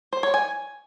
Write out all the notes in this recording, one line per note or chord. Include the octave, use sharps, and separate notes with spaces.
C5
C#5
G#5